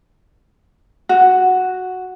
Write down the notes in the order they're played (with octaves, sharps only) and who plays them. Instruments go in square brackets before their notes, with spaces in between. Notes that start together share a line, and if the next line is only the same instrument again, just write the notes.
[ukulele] F#4